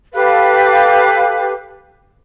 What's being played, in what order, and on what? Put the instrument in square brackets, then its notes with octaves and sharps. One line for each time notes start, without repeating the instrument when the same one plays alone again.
[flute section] G4 A4 B4 F5